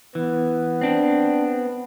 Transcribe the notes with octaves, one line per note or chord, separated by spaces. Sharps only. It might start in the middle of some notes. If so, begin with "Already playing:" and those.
E3 B3
C4 D4